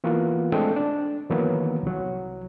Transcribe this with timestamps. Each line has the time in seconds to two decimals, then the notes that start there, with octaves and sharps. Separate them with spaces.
0.04 E3 A#3 B3 F4 F#4
0.52 G#3 A3 C4 D4 A4 G5
0.76 D4
1.30 D#3 E3 F#3 A#3 B3
1.83 C2 F#3